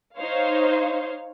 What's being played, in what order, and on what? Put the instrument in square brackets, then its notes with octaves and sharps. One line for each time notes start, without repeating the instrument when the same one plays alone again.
[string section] D#4 C5 C#5 F5